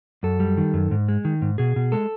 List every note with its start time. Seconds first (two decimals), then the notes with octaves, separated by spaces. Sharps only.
0.23 F#2 A4
0.40 G3
0.58 D#3
0.74 F#2
0.91 G#2
1.08 G#3
1.25 D#3
1.42 G#2
1.58 B2 G#4
1.76 B2
1.92 G#3 A4